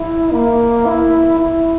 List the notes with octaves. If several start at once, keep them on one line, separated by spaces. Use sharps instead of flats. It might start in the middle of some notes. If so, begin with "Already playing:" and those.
Already playing: E4
A#3
E4
E4